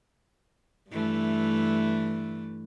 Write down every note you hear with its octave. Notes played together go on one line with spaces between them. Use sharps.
G2 E3 A3